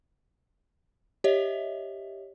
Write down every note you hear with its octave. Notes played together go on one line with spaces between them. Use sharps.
G4 C#5 D#5 E5